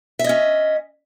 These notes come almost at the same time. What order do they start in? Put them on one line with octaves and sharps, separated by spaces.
E5 D#5 C#4